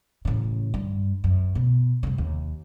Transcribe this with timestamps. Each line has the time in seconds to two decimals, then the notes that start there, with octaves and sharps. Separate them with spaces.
0.25 A1 C#3
0.74 G2
1.24 F#2
1.55 B2
2.03 G2 C3
2.18 D#2